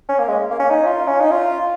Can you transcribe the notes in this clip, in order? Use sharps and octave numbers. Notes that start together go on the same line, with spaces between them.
C#4
A#3
G#3
A#3
C#4
D#4
F4
C#4
D#4
F4